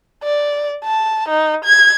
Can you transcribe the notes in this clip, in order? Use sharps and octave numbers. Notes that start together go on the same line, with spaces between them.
D5
A5
D#4
G#6